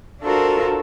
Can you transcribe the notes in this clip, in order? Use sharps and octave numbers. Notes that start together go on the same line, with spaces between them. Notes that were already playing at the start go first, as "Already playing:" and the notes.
D4 F4 F#4 A4 A#4 C5